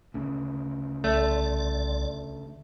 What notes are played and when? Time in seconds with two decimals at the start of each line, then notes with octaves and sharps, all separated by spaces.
0.14 D2 C#3
1.04 C2 A3 D5